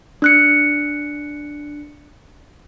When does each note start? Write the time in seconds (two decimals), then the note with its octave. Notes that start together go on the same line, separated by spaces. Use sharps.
0.22 D4 F#6 C#7